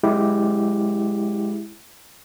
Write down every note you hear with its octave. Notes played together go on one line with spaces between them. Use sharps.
G#3 E4 G4